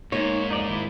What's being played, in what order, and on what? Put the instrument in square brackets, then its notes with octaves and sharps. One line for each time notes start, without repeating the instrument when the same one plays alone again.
[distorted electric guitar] G#2 [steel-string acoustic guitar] A#3 [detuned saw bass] D#4 [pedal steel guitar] C#5
[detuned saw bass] F2 [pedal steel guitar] D#4 D5
[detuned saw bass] G#1 [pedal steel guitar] E4